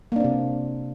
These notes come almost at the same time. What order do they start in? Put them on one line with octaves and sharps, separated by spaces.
A#3 D4 C4 C3